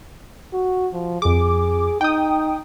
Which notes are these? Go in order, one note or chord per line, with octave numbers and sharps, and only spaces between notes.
F#4
F3
F2 G#4 D6
D#4 G5 D#6